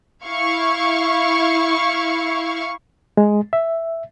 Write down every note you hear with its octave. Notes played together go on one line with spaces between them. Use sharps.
E4 F5 C#6
G#3
E5